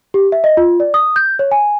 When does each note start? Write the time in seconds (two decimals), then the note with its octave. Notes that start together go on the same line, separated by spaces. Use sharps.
0.14 G4
0.32 E5
0.44 D#5
0.57 F4
0.80 D5
0.94 D#6
1.16 G6
1.39 C#5
1.51 G#5